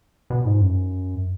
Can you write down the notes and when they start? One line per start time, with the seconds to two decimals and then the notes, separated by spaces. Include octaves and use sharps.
0.30 B2
0.41 A#2
0.45 G#2
0.61 F#2